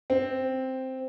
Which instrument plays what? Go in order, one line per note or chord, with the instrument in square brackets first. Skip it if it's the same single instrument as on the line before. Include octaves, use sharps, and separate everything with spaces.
[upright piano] C4